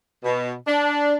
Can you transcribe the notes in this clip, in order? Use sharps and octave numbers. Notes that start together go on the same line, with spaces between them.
B2
D4